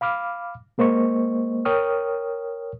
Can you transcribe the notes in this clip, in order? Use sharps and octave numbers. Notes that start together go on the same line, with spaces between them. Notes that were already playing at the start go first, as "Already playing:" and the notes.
F5 B5 D6 F6
G#3 A#3 C5 D#5 C#6
A#4 C#5 G5 C#6 D#6 F6